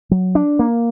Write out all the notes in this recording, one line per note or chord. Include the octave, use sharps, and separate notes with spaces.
F#3
D4
A#3